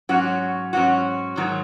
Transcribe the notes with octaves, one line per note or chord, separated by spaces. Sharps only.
G#2 F#3 C#4 F#4
G#2 F#3 C#4 F#4
G#2 D#3 F#3